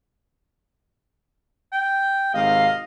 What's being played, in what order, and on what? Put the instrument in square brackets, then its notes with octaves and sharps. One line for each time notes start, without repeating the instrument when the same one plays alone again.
[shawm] G5
[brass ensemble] G#1 C3 F5 [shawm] D#5